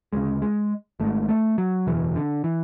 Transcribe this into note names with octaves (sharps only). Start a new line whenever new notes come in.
D2 C#3 G#3
G#3
G#1 G#2 A3
A3
F#3
F#1 E2 B2 E3
D3
E3